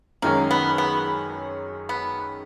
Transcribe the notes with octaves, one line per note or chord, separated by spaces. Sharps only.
F#2 D#3 G#3 A#3 C#4
B3
B3
B3